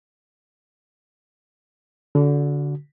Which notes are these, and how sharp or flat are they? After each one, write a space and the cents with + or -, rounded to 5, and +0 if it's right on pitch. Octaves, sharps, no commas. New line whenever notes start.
D3 -25 F#4 +0